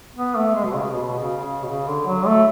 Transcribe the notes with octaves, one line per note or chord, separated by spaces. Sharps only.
B3
A3
G#3
B2
C#3
B2
C#3
C#3
B2
C#3
D3
F#3
A3